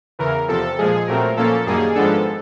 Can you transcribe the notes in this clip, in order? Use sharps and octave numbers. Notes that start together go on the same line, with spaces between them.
E2 C#3 E3 A#4
E2 C3 F3 A4
A#2 F3 G#3 G#4
A#2 F#3 A3 C4 A#4
A#2 F3 A#3 C#4 A4
F#2 D#3 G3 A#3 G#4
G#2 F3 G#3 B3 D4 A4